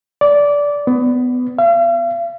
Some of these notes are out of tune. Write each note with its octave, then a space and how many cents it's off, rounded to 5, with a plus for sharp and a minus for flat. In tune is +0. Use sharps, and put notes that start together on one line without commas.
D5 -15
B3 +20
F5 -45